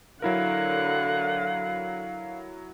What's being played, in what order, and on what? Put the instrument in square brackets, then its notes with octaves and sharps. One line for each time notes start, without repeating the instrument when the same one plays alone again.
[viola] D3 F#5 [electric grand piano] F#3 E4 A#4 [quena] F5